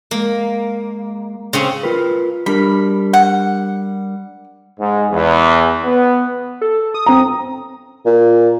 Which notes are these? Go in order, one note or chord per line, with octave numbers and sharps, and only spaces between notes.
G#3 A#3
C#3 C4 C#4
F4 A#4 B4
G3 D4 A#4 B5
F#5
G#2
E2
B3
A4
D#6
C4 A#5
A#2